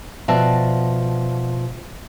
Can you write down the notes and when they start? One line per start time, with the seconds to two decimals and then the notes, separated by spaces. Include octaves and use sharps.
0.28 B2 F3 F#4 D5 E5 A5